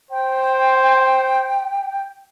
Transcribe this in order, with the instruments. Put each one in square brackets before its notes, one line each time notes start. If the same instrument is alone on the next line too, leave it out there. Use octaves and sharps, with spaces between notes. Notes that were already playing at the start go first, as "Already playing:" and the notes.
[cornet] C5 [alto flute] G5